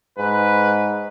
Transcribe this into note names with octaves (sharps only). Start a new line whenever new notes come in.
G#2 B4